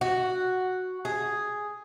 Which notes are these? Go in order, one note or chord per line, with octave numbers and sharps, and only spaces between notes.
F#4
G#4